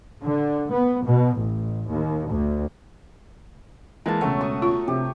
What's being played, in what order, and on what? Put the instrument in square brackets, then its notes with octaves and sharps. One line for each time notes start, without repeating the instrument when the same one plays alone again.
[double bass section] D3
B3
B2
A1
D#2
D2
[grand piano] E3 G#3 A#3 [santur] A5 A#5
[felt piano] E1 C#2 C#4 [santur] F#3 F#4 C#5 [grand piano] A3
[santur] C#6 D#6
[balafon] F4
[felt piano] C3 [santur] G4